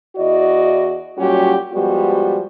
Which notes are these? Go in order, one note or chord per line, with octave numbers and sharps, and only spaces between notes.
E2 E4 F#4 D5 D#5
A#2 F#3 G3 C#4 F#4 G4
F3 G3 G#3 B3 F#4 G4